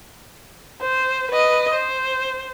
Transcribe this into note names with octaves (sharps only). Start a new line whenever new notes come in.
C5
B4 D#5
C5